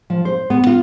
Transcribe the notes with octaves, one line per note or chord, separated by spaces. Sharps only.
F3
C5
B3
F4